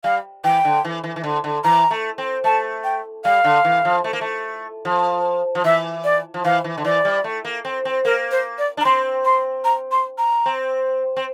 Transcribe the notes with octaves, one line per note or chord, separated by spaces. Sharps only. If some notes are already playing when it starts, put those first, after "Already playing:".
G3 F5
E3 G5
D3
E3
E3
E3
D3
D3
E3 A#5
A3
C4
A3 A5
G5
G3 F5
D3
E3
F3
A3
A#3
A3
F3
F3
E3 E5
D5
F3
E3 F5
E3
D3
E3 D5
G3
A3
A#3
C4
C4
A#3 A#4
C5
D5
D4
A#5
C4 C6
C6
A#5
C6
A#5
C4
C4